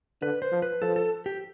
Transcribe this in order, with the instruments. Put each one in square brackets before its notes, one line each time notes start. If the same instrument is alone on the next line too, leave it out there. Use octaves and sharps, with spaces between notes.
[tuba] D3 [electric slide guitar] B4
[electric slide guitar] C5
[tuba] F3
[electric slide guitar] B4
[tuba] F3 [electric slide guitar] A4
[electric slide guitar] A4
G4